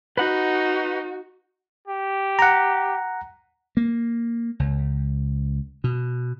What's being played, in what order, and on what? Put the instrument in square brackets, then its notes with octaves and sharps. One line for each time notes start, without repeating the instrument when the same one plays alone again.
[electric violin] D#4 [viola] F#4 [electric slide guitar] B4 F#5
[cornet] G4
[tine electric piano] F#5 A#5
[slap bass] A#3
C#2
B2